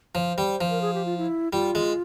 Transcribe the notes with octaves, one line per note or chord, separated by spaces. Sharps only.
F3 C5 C#5
G3
F3
A#4
G#4
G4
F4
E4
G3 F4
G#3